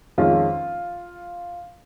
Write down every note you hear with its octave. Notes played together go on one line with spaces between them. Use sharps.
F2 D#3 G#3 C#4 F4